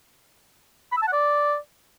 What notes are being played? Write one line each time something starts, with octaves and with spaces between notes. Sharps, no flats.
B5
E6
A5
F#5
D5